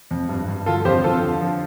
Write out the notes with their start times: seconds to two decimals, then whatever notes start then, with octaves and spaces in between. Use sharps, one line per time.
0.11 F2
0.29 G2
0.48 G2
0.66 D3 F4 A4
0.85 F2 G4 C5
1.04 F2 F4 A4
1.22 D3
1.41 F3